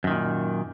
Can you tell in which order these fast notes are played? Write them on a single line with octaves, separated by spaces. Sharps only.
F#2 D#3 A#2